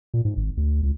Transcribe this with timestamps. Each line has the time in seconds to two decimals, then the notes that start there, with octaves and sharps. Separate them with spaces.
0.14 A#2
0.25 G#2
0.37 G#1
0.57 D2
0.83 C#2